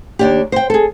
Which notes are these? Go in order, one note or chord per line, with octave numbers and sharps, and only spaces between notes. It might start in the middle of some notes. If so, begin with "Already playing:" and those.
D#2 D4 G4
C5 G5
G#4 A4